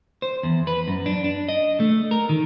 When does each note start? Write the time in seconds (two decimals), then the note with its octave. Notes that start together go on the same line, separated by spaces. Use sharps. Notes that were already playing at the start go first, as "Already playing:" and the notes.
0.22 C5
0.43 E2
0.67 B4
0.88 F#2
1.06 D4
1.24 D4
1.48 D#5
1.80 A3
2.11 A#4
2.29 D#3